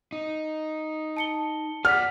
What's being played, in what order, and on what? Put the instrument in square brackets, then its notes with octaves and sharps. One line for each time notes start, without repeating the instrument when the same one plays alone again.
[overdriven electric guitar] D#4
[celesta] A5 C#7 G7
[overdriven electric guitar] G#4 D5 [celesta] F#5 B6 [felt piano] F6